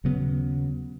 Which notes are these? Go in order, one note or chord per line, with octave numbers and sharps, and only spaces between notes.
D#2 C#3 F#3 B3